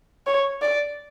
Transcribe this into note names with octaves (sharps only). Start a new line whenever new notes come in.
C#5
D5